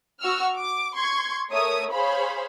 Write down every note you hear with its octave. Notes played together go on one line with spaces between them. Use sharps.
F#4 C#6 E6 F6
D6
C6 C#6 G#6
A3 A#4 C#5 E5 D#6
G#4 C5 C#5 F5 B5